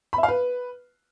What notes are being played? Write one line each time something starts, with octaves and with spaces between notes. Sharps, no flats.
B5
E5
F5
B4